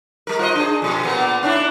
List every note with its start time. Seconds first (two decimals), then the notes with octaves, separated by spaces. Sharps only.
0.27 G3 A#4
0.39 F4 C5 D#5
0.55 D4 G#4
0.82 F2 B2
1.03 A#2 A#3 B3
1.43 C#4 D4 E4